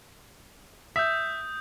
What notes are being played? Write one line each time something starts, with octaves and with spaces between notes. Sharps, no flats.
E5 D#6 G6